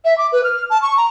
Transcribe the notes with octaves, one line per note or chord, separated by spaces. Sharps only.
E5
D6
B4
F6
A5
C#6
A#5